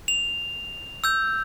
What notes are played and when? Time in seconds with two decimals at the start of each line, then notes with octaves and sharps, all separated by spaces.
0.08 F7
1.04 E6 G6